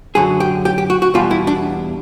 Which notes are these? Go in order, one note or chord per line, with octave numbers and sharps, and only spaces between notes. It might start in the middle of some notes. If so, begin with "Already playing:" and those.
F#2 D3 F#3 G#4
G4
G4
G4
F#4
F#4
E2 B2 G3 F4
E4
D4